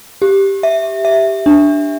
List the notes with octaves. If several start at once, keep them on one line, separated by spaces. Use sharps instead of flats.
G4
E5
E5
D4